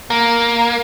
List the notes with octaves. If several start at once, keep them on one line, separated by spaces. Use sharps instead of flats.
A#3